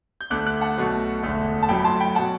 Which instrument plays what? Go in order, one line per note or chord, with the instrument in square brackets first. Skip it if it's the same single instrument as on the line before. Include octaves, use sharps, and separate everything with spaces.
[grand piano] G6
D2 D3 A3 D6 F#6
D6 F#6
F#5 A5
B1 B2 A3
E1 D2 D3 A3
A5
G1 F#2 F#3 A3 G5 B5
B5
A5 C6
G5 B5
B2 F#3 F#5 A5